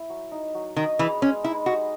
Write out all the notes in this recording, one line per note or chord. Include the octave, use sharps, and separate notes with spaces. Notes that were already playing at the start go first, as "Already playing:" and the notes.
Already playing: E4 E5
F#3
D#4
F#3
D#3 D#5
E3 G#4
G#3 C#4
D#4 E4
F#4 D#5